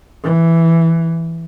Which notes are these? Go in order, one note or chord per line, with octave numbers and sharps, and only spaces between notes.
E3